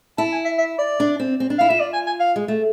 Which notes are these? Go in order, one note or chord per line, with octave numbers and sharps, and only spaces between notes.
E4 A5
G#5
E5
E5
D5
D4
C4
C4
D4
E4 F5
F4 E5
D5
G#5
G#5
F5
G#3
A3